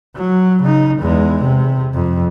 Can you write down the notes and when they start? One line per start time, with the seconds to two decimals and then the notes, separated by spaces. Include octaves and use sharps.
0.16 F#3
0.63 C#3 D#4
0.99 E2 G#3
1.43 C3
1.94 F2